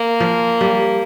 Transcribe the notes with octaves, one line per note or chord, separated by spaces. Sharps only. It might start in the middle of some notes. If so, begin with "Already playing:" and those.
Already playing: A#3
F3
G3